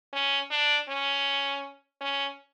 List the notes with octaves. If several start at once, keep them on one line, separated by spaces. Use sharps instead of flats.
C#4
D4
C#4
C#4